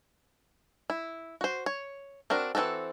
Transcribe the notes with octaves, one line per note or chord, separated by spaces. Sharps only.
E4
F#4 C5
C#5
C4 D4 F#4 A#4
E3 F3 C4 F#4 A4